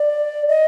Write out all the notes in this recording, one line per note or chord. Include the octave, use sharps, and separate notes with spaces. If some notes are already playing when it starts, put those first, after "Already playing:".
Already playing: D5
D#5